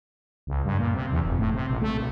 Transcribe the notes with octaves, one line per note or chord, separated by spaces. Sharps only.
C#2
G2
A#2
C3
E2
F1
A2
C3
A#1
A3
B1